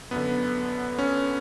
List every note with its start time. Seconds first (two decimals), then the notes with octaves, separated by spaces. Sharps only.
0.11 F#2 D3 B3
0.99 C#4